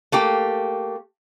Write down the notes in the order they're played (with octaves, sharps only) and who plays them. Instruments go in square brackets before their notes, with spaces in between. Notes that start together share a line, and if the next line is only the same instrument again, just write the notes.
[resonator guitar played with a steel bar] A3 A#3 G4